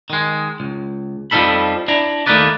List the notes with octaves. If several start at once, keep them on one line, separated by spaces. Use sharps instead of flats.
D#3 G#3
C#2
F2 F3 G3 D#4 A4 B5
D4 E4 A#5
D#2 A3 A#3 D#4 B4 D5